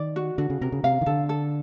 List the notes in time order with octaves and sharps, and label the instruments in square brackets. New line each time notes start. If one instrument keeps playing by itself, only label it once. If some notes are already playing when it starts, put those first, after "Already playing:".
Already playing: [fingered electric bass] D#3 [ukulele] D5
[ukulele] F#4
[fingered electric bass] D3 [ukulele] F#4
[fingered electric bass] C#3
[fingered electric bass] C3 [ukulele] A#4
[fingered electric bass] C#3
[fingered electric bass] C3 [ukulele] F5
[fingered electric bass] D#3
[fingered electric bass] D3 [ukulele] A4
[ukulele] A4